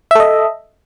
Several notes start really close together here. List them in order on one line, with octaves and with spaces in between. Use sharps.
E5 A4 D#5